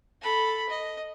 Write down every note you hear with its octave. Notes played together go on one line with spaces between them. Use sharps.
A4 B5
D#5